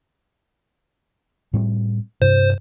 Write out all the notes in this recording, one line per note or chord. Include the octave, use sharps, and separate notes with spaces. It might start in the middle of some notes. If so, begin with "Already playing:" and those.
A2 G3 C4
G2 C3 C5